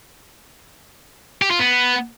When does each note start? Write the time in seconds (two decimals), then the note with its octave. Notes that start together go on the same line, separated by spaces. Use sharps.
1.42 G4
1.50 F4
1.59 B3